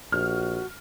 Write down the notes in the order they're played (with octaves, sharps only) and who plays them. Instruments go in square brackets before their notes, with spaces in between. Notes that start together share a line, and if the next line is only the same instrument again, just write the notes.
[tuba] A#1 [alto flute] F#4 [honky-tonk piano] F6